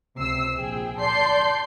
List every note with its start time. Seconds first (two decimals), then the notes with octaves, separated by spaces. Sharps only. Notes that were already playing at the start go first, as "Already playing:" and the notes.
0.17 C#2 C3 E6 C7
0.56 A#1 G#4 G5
0.99 D5 A5 C6 G6 C7